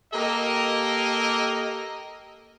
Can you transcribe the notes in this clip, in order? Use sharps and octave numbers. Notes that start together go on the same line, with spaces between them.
A#3 G4 A4 A#4 D#5